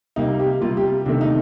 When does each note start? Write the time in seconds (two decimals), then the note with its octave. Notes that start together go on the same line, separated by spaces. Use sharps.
0.16 C3 G3 A#3 D#4
0.40 G4
0.61 C3 G3 A#3 F4
0.77 G4
1.06 C3 D#3 A3 D4
1.21 D#4